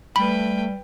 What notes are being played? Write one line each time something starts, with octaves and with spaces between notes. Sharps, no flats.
G3 A3 B4 G5 B5